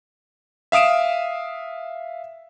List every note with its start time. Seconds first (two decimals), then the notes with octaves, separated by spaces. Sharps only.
0.72 E5 F5 D#6 D7 E7